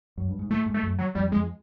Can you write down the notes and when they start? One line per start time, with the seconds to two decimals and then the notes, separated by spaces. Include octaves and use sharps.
0.18 F#2
0.28 G2
0.39 G#2
0.50 A2 A3
0.66 G#2
0.74 A3
0.83 F#2
0.99 F#3
1.15 F2 G3
1.32 F2 G#3